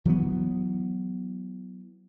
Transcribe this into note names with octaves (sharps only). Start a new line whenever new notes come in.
E3 F#3 A#3 B3